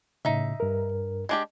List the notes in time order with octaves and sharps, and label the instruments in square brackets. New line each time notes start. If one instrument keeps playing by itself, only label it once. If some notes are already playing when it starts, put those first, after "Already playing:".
[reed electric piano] A2 C#3 [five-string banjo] D#4 E5
[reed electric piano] G2 A#4
[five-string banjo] G#3 D4 G4